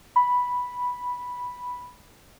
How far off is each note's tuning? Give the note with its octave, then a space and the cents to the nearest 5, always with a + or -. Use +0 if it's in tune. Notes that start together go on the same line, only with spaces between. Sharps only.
B5 -5